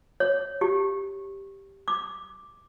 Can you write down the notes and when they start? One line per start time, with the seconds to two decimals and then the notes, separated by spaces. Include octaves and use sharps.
0.20 C#5
0.61 G4
1.88 D6